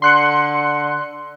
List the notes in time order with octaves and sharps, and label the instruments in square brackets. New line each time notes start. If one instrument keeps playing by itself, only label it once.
[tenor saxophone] D3 [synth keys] C6 F#6 C#7